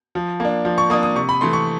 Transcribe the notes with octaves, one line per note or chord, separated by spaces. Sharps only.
F3
A#3 D4
F3
C#6
A#3 D4 D#6
D#6
C3 C#6
B5
E3 A3 C6
C#6